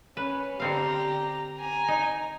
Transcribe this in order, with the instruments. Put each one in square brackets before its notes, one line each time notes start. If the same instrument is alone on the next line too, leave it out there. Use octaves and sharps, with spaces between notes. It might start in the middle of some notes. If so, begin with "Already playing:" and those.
[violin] C#4 [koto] B4
[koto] D3 C4 F5 [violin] G4 A#5
[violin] G#5 A#5
[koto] D#4